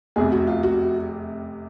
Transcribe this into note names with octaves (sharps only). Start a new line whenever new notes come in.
F1 E2 C3 G#4
F#4
F4
F#4